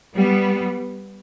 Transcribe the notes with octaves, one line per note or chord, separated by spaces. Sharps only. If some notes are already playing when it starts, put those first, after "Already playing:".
G3 B3